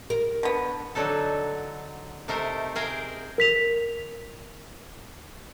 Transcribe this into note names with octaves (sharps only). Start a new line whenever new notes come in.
A#4
D3 B3
D3 F#3 D#4 A4
C3 A3 D#4 A#4 C5
G#4 A#4 C5 D#5 F5 G5
A#4 B6 F7